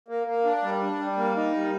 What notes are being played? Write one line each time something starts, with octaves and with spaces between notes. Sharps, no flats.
A#3
A#3
D4
G3
D4
G3
A#3
D#4
G3